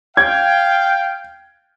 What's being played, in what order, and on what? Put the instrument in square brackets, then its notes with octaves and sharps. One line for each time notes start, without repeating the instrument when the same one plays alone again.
[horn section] F5 G5 [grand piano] G#6